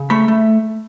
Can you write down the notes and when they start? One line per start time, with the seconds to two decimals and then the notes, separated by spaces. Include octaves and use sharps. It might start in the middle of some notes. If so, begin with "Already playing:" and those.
Already playing: C#3
0.10 A3 B5
0.28 A3